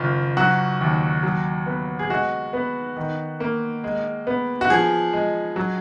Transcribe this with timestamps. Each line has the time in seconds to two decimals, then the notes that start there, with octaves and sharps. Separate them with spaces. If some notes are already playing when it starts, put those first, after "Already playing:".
Already playing: F#1 D#3 F4
0.37 F#3 F#4
0.81 D#2
1.23 F#3
1.67 B3
1.99 G#4
2.10 G#3 F#4
2.53 B3
2.97 D#3
3.40 A#3
3.84 G#3
4.27 B3
4.61 F#4
4.70 F3 G#4
5.13 G#3
5.56 F#3